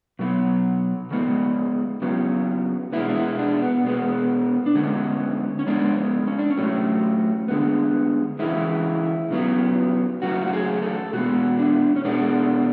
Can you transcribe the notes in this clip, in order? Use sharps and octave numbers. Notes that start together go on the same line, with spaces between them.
B2 F#3 B3
C#3 G#3 B3
C#3 F#3 B3
B2 G#3 B3 E4
D4
E4
D4
B3
B2 G#3 B3
D4
D3 G#3 B3 C#4
C#4
C#3 G#3 B3 D4
B3
C#4
D4
C#4
A2 F#3 A3
D3 G#3 B3
C#3 E3 G#3 E4
C#3 F#3 B3
C#3 F#3 A3 F#4
F#4
G#4
A4
B2 G#3 B3 F#4
D4
C#4
B2 G#3 B3 D4